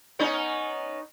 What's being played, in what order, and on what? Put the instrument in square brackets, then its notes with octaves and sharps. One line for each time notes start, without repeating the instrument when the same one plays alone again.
[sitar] B3 C#4 D#4